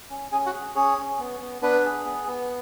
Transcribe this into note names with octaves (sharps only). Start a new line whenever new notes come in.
C#4
C#4 G#4 G#5
F#4 F#5
G#4
C#4 G#4 C#5
C#4
B3
B3
B3 D4 B4
G#4
B3
B3